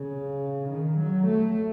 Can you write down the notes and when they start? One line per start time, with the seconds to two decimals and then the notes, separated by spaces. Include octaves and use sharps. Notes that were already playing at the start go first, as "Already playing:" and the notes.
Already playing: C#3
0.70 D#3
0.99 F#3
1.27 A3